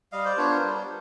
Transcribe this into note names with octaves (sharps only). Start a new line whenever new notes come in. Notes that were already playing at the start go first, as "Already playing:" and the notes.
G3 D#5 F5
C5 D5
B3 D4 F4 B4 C#5
A#4 C5
G3